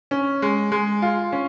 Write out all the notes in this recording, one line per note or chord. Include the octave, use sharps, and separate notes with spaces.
C#4
G#3
G#3
F4
C#4